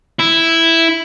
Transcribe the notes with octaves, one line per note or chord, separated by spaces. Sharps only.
E4